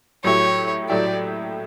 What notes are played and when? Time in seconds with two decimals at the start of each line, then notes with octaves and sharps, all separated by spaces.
0.24 A2 F#3 A3 E4 G4 C#5
0.89 A2 F#3 A3 E4 G4 D5